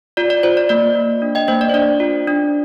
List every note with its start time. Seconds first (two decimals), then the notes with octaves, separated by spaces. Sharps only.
0.17 F4 D5
0.30 D5
0.43 F4 C5
0.57 D5
0.69 A#3 D5
0.95 A#3
1.22 D4
1.35 D#5 G5
1.48 A#3 C5 D#5
1.61 D5
1.69 C5
1.74 D4 D5
2.00 F4
2.27 D4